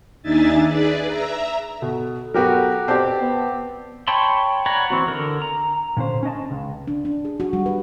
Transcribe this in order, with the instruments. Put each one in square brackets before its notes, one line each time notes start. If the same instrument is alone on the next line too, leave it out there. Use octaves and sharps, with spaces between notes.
[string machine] D#2 D4 D#4 E5 G#5 A6
G#4 B4 D5
E5 A#5
[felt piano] B2 [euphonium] A4
[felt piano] F#3 B3 [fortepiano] F#4 G4 A#4
[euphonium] B2 [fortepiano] C4 G4 [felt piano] D5 A5
[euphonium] B3
[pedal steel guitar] C#5 G5 A5 B5 C6
C#5 D5 F#5 A#5 B5
E3 C4 F#4
D3 A#4
A#5
[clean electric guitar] A#2 D3 C#4 C5
C#4 D4 D#5 A5
C#2
[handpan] D4
D4
G#4
F#4
G3
B4